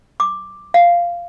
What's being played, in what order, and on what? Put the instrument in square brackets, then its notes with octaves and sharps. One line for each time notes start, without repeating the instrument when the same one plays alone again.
[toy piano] D6
F5